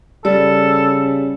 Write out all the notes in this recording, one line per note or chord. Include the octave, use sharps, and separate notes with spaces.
C#3 G3 A4 D5